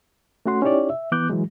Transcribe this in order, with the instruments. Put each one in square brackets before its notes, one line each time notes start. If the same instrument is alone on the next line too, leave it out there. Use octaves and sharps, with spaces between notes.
[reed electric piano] A3 C#4 F#4 F#5 C6
C#4 D#4 E4 G4 C#5 D5
E5
E3 B3 D6 F#6 G6
E3 F#3 G#3